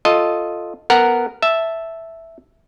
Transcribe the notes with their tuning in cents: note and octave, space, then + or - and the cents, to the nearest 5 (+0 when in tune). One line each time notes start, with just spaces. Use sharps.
F4 +0 A4 +0 D#5 +0
B3 +0 A#4 -10 F#5 +0
E5 +0 A5 +0